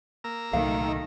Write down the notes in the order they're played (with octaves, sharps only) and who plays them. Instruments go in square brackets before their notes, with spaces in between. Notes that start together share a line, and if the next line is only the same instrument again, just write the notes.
[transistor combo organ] A#3 A#5 E6
[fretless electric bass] C2 A#2 F#3 [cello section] D#3 A3 A4 [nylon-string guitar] F5